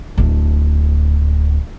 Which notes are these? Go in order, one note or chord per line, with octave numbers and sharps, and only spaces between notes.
D1 D4